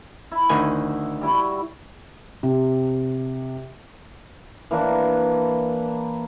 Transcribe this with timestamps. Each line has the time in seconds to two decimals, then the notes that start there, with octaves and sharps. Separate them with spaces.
0.31 E4
0.50 D2 D#3 G#5
1.21 G3 E4 F#4
2.43 C3
4.71 E3 A#3 D4